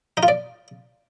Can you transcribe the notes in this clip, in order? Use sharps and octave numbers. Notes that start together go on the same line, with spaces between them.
D#4
F4
D5